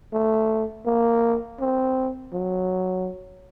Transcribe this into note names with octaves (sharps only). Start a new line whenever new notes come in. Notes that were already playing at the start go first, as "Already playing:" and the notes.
A3
A#3
C4
F#3